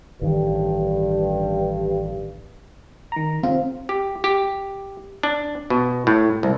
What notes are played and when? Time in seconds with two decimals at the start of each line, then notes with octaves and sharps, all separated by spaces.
0.22 A1 G2 D#3
3.12 D#3 A#5
3.43 C4 F4
3.89 G4
4.24 G4
5.23 D4
5.70 B2
6.07 A2
6.43 C2